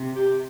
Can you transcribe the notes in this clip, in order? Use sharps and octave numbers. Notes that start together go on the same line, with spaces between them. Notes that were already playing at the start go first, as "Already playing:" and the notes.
Already playing: C3
G4